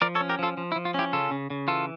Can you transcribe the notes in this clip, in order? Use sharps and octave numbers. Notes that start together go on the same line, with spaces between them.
F3 A#4 D5
A4 C#5
C#4
G4 A#4
F3 F4 A4
F3
E4
F3
F4
C#4 E4 G4
C#3 F4 A4
C#3
C#3
E3 F4 A4